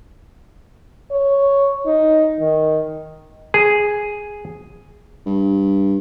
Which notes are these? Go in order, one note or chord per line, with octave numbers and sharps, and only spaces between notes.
C#5
D#4
D#3
G#4
G2